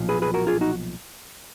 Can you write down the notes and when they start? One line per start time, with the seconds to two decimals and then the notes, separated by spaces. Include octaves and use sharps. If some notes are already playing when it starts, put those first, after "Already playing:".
Already playing: B1 A#2 F3
0.09 G#4 B4
0.22 G#4 B4
0.34 F#4 A#4
0.47 F4 G#4
0.61 D#4 F#4